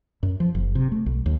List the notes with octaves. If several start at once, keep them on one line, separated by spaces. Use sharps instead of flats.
F#2
F3
F#1
C3
A3
B1
D#2